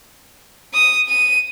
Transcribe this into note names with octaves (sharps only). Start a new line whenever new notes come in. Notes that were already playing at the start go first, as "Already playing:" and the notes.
D#6
D#7